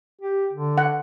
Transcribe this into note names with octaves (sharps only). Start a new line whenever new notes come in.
G4
D3
F#5